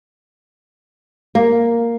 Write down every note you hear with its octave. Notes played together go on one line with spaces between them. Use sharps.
A#3